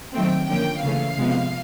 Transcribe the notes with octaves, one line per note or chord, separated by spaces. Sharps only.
D#3 F#3 A3 C4 G5
D3 F3 A#3 C#4 G5
C#3 E3 A3 C#4 F5
C3 F3 G#3 B3